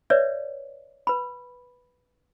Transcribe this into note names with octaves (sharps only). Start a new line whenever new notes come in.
B4 C#5 D5 E5
B4 B5